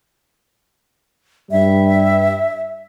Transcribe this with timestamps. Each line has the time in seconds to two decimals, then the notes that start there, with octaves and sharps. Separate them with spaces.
1.51 G2 G3 E5